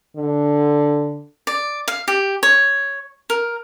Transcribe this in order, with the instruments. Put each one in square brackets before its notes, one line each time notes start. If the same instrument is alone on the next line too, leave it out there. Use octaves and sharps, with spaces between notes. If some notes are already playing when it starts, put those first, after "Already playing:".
[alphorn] D3
[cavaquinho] D5
F5
G4
C#5
A#4